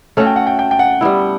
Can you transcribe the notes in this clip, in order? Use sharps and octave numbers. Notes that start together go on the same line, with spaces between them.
A3 C#4 F#4 A5
G5
F#5
G5
G5
G5
F#5
G3 B3 E4